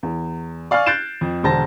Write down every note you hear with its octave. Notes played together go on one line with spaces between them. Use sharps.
E2
D5 F5 G#5 C#6 F6
F#6 G6 A6 C7 D7 E7
F2
E1 D3 C5 A5 A#6